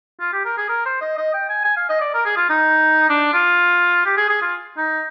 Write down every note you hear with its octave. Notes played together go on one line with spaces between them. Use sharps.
F4
G4
A#4
G#4
A#4
C5
D#5
D#5
G5
G#5
G#5
F5
D#5
D5
A#4
G#4
F4
D#4
D4
F4
G4
G#4
G#4
F4
D#4